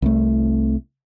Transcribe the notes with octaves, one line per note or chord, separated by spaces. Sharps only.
C2 A3